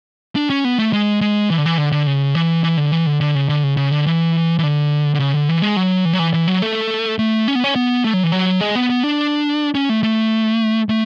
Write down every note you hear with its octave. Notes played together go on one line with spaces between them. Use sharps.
D4
C#4
B3
A3
G#3
G#3
E3
D3
E3
D3
D3
C#3
E3
E3
D3
E3
D3
D3
C#3
D3
C#3
C#3
D3
E3
E3
D3
D3
C#3
D3
E3
G#3
F#3
E3
F#3
E3
E3
F#3
A3
A3
C#4
B3
C#4
B3
A3
F#3
E3
F#3
G#3
B3
B3
D4
C#4
A3
A3
A3